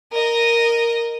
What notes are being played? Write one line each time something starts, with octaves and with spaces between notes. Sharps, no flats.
A#4 D#5